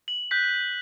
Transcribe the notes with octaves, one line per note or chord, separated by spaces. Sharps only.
F#7
F#6 G6 B6